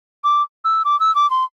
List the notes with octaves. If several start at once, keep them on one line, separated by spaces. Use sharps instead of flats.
D6
E6
D6
E6
D6
C6